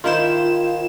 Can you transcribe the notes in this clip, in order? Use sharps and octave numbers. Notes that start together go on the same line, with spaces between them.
D#3 E4 F4 C5 E7